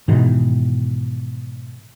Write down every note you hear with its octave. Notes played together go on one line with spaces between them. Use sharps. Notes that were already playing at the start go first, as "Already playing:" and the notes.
G#2 B2 D#3 E3